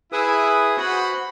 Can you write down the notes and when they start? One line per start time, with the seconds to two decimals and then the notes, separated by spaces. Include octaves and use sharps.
0.12 E4 G#4 B4 D#6
0.77 F#4 C5 F#5 B5